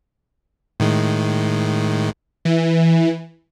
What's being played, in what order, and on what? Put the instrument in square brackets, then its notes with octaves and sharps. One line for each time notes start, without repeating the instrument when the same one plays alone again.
[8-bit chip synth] A2 D#3 G#3
[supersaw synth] E3